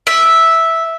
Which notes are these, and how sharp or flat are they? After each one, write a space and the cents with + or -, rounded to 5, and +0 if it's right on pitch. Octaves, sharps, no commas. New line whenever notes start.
E5 -5